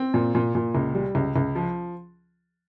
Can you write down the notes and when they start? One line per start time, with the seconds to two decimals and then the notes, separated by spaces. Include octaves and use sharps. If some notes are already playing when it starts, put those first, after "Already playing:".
Already playing: C4
0.14 A#2
0.35 A#2
0.55 A#2
0.75 C#2
0.95 G3
1.15 C#2
1.36 C#2
1.55 F3